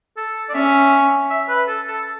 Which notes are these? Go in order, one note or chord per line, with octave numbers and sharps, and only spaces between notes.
A4
D5
C#4 E5
E5
B4
A4
A4